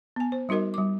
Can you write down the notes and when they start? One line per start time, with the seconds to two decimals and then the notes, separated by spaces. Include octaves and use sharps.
0.16 B3 G#5
0.32 C5
0.49 G3 D#4 F#4 A#4 D#5
0.74 G3 D6